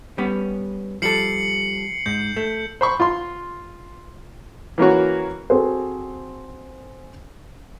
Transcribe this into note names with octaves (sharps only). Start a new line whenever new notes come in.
G3 B3 C#4
F3 G3 A4 C7 C#7 F#7
G#2 G6
A3
C5 B5 C#6
F4 C6
E3 A#3 C#4 F#4
C4 F#4 G#4 A4 C5